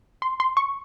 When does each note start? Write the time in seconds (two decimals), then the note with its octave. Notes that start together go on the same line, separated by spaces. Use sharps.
0.22 C6
0.40 C6
0.57 C#6